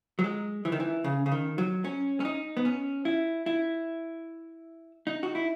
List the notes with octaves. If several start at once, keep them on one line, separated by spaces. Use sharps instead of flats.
F#3
G#3
E3
D#3
E3
C#3
C#3
D#3
F#3
C#4
C#4
D#4
B3
C#4
E4
E4
D#4
F#4
E4